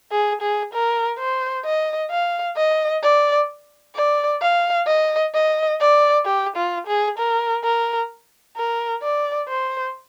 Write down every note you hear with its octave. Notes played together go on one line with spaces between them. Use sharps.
G#4
G#4
A#4
C5
D#5
F5
D#5
D5
D5
F5
D#5
D#5
D5
G4
F4
G#4
A#4
A#4
A#4
D5
C5